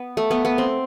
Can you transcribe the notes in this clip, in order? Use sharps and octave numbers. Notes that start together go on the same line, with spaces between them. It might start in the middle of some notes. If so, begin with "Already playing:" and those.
Already playing: B3
A3
B3
B3
C4